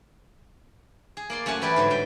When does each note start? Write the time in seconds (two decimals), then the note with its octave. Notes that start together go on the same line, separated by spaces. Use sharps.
1.17 G#4
1.30 A#3 D5 C6
1.46 F#2 A3 F#5 G#5 A5
1.61 E3 E4 G4 B4 D5 G#5
1.76 G#2 D3 F#3
1.90 G#2 G3 G5